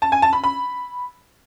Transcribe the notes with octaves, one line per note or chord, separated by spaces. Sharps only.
A5
G#5
A5
B5
B5